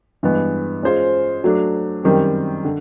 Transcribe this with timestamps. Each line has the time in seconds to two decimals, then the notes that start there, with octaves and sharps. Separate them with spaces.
0.23 G2 E3 G#3 B3
0.83 G#3 C#4 F4 G#4 C5
1.44 F#3 A3 D4
2.04 F#2 D#3 G3 C4
2.65 D3